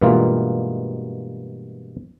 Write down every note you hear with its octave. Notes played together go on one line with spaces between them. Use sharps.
G2 B2 E3 G#3 A#3 F4